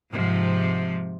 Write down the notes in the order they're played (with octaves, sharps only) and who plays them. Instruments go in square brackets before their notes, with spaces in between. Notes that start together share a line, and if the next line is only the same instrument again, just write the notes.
[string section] G#2 C3 F3